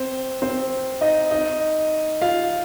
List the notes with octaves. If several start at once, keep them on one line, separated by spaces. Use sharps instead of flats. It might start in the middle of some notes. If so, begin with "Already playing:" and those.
Already playing: C4 C5
C4 C5
D#4 D#5
D#4 D#5
F4 F5